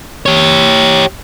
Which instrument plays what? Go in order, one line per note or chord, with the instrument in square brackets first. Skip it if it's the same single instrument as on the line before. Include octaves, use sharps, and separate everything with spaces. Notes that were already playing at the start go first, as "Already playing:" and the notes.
[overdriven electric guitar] G4 C#5